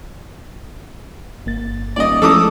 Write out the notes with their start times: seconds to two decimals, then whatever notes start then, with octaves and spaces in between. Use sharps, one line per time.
1.46 G1 A#3 A6
1.96 D#1 D5 D#5
2.22 A1 F3 G#3 A4 A5 D6 D#6